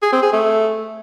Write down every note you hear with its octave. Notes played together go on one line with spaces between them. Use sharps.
G#4
C4
G#4
A3